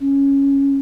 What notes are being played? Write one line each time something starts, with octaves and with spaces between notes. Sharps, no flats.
C#4